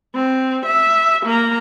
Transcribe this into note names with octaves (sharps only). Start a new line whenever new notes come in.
C4
E5
A#3 A#5